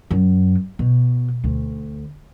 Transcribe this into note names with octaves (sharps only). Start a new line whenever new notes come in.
F#2
B2
D2